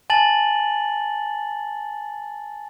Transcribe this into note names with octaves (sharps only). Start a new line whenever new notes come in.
G#5 A5 A6 F#7